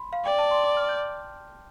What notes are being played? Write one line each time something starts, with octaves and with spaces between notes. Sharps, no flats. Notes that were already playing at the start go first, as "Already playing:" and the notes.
Already playing: B5 C6
F5
D5 G5
A5
C6
D6
F6
G6